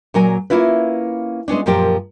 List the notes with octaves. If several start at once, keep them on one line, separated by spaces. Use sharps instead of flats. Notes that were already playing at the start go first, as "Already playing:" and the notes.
A#2 F#3 A#4 G#5
A#3 C#4 E4 F4 B4
G#3 B3 C#4 D4
F#2 A#2 F3 F4 G4 A#4